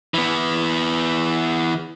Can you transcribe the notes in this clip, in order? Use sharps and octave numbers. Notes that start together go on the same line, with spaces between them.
E3 B3